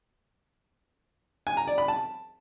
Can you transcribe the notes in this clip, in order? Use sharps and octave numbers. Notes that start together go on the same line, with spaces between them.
G#5
A#5
D5
B5
A5